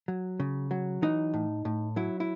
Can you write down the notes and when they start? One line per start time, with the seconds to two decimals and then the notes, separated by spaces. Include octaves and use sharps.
0.08 F#3
0.40 C#3
0.71 F#3
1.02 E3 D#4
1.34 A2
1.65 A2
1.96 F#3 E4
2.20 E4